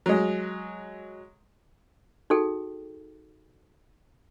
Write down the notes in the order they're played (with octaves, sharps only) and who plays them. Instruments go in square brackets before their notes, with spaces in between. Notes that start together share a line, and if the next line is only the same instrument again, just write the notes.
[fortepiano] F#3 G#3
[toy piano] D#4 F#4 G#4 A4 G5